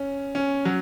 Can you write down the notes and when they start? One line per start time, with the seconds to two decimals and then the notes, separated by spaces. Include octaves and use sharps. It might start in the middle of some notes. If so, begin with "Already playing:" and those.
Already playing: C#4
0.35 C#4
0.65 F#3